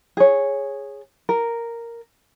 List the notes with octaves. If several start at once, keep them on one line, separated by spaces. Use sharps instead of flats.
G#4 C#5
A#4